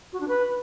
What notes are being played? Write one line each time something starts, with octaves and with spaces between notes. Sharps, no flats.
F#4
D4
B4